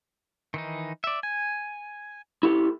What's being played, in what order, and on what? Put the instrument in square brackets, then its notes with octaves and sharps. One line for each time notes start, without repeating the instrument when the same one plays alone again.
[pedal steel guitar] D#3 E3 D#4
D5 E5
G#5
[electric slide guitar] E4 G4 A4